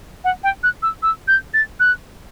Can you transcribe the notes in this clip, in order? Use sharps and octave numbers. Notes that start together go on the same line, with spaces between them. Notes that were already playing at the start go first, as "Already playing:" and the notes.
F#5
G5
F#6
E6
E6
G6
A6
F#6